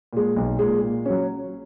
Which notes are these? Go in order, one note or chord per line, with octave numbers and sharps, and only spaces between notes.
A#2 G#3
B1
A#2 G#3
A#2
F#3 C#4